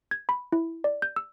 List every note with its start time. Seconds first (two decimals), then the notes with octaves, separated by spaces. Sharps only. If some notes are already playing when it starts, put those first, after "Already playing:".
0.11 G#6
0.29 B5
0.52 E4
0.84 D5
1.02 G6
1.16 E6